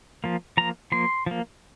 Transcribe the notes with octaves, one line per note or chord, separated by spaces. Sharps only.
F3 A#3
F3 A#3 A#5
F3 A#3 C6
F3 A#3